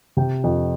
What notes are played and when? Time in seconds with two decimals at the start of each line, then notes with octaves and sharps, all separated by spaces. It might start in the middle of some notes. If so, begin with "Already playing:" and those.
0.17 C3 G5
0.44 F2